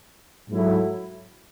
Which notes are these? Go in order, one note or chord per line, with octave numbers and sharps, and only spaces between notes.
G#2 F#3 A3 E4